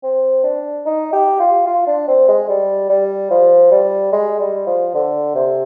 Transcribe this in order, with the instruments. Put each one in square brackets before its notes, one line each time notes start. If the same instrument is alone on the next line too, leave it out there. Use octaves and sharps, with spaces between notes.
[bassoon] C4
D4
D#4
G4
F4
F4
D4
C4
G#3
G3
G3
F3
G3
G#3
G3
F3
D3
C3